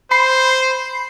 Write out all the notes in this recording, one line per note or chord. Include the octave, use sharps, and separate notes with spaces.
C5 B5 C7